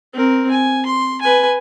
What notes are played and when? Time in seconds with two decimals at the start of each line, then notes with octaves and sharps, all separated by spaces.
0.13 C4 A#4
0.51 G#5
0.86 C6
1.21 B4 G#5